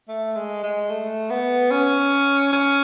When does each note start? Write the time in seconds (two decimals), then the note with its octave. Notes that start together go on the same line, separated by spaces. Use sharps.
0.08 A3
0.36 G#3
0.63 G#3
0.90 A3
1.30 B3
1.71 C#4
2.53 C#4